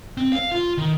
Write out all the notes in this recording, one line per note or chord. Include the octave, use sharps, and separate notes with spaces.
C4
F5
F4
D#3